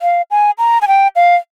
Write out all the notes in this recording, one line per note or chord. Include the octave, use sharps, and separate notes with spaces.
F5
G#5
A#5
G#5
G5
F5